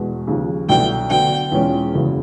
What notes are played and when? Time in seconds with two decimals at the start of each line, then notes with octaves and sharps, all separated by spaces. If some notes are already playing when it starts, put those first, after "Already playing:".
Already playing: E2 B2 G#3
0.27 D#2 C#3 F3
0.68 C2 B2 F#3 A3 D4 G5
1.10 D3 F#3 B3 G5
1.52 E2 B2 G#3 C#4 F4
1.94 F#1 E2 C#3 F#3